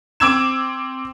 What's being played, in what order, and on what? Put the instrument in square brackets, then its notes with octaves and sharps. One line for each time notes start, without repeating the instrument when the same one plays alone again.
[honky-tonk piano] C4 D6 E6 G#6 E7